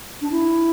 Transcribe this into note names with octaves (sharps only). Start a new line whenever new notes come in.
D4
E4